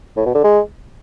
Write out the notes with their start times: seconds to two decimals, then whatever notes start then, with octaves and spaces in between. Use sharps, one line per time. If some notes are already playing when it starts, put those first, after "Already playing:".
0.17 A2
0.26 B2
0.35 D3
0.44 G#3